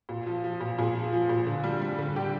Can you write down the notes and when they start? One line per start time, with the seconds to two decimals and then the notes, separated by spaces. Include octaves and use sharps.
0.09 A#2
0.26 F3
0.44 F3
0.60 A#2
0.78 A#2 G#4
0.95 F3
1.13 F3
1.29 A#2
1.47 D3
1.64 G3
1.81 G3
1.99 D3
2.15 D3 G4